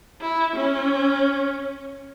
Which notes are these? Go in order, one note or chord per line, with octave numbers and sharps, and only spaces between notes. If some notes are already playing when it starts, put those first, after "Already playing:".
E4
C#4